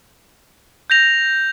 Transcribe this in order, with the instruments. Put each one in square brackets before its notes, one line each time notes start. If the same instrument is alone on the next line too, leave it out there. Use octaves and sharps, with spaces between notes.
[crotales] G6 A#6 F7